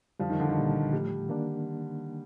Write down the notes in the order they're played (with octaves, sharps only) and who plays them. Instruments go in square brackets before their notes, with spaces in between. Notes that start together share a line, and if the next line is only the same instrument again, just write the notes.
[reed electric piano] F2 D3 G3 [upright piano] F3
[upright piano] D#3
D3
D#3
[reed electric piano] C2 A#2 G3
[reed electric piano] A2 F3 A3 [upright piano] G3
[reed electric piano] D#3 A#3 D4